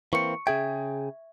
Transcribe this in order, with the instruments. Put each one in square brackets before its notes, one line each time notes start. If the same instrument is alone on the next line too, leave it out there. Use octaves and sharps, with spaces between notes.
[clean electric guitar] E3 A#3 C4 [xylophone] C#6 C#7
[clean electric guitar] C#3 G#4 G5 [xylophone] E5 G#6